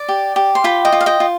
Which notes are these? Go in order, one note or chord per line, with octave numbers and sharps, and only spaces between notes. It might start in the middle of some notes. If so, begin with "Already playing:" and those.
Already playing: D5
G4
G4
C6
F4 G5 B5
D#5 G5
F4
F5
D#5 G5
F4